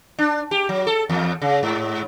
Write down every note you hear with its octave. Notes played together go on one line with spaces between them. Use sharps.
D4
G4
F#3
A4
E2
C#3
G#2